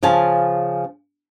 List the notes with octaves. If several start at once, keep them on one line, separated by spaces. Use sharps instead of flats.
C#3 F3 F5 G#5 A5